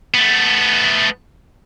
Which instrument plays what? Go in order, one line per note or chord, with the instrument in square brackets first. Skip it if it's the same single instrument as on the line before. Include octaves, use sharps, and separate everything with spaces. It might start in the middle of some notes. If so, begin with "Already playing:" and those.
[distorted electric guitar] A3 B3